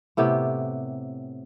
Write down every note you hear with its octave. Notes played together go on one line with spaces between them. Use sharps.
A2 C3 B3 G4